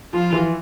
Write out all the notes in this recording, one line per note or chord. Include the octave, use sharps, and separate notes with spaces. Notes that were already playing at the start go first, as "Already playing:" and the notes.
F3 F4
E3